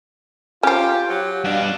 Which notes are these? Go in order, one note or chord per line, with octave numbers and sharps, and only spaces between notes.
C#4 F4 G4 C5
F#3 G4
G2 B2 D4 F5